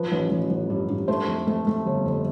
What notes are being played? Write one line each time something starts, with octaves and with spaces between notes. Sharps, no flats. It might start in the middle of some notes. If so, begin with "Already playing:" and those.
Already playing: F3 B4
A1
A1
A1
G2
G2
A3 C5
F2
A3
A3
G1
F2